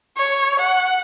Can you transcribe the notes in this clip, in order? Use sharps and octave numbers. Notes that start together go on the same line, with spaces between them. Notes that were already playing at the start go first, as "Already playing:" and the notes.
C#5
F#5